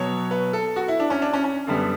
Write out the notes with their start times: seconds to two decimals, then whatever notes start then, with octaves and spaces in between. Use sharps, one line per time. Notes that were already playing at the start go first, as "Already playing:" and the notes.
Already playing: B2 F#3 B3 C#5
0.31 B4
0.53 A4
0.76 F#4
0.88 E4
1.00 D4
1.10 C#4
1.22 D4
1.33 C#4
1.44 C#4
1.67 F#2 D3 G3 B3